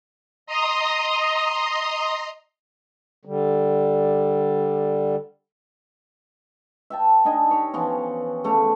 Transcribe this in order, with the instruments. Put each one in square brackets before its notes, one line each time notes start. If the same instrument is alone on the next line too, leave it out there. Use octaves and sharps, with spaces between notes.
[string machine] D#5 A#5 C6 D#6
[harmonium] D3 G3
[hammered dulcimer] E5 G5 A5
D4 D#4 D#5 G#5
G4 C#5
E3 F3 B3 C#4
C#3 A3 C#5 D6